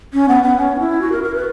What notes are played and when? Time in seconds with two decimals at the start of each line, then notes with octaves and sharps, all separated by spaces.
0.14 C#4
0.29 B3
0.43 B3
0.58 C#4
0.75 D4
0.80 E4
1.02 F#4
1.12 A#4
1.23 A#4
1.34 B4